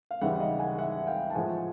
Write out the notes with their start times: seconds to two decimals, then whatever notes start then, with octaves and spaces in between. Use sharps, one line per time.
0.11 F5
0.21 D#2 C#3 E3 G3 E5 F#5
0.40 D#5 F5
0.59 F#5 G#5
0.78 E5 F#5
1.07 F5 G5
1.30 A5
1.35 A2 F3 G#3 F#5 G#5